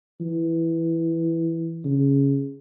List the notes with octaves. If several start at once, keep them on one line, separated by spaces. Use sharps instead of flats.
E3
C#3